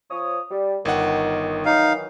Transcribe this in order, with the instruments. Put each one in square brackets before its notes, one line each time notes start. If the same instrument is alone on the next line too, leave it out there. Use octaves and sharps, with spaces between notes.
[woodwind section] F3 C#5 D#6
G3
[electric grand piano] G1 F#5 [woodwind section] D#3
[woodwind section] D#3 E3 F#3 [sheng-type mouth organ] D#4 F5